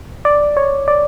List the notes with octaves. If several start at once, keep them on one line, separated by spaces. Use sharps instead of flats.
D5
C#5
D5